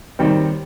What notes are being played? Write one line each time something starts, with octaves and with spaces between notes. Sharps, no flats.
D#2 D#3 G3 C4